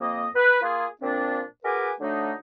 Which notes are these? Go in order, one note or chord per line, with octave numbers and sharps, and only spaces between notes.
F2 A#3 D#5
B4
A#3 F4 G#4
A#2 F3 C4 D4
F#4 G#4 A#4 B4 G#5 D6
D3 F#3 A3 D4 D#4